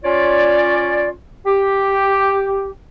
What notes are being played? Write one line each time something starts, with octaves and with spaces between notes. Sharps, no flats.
C#4 F4 C#5 D5
G4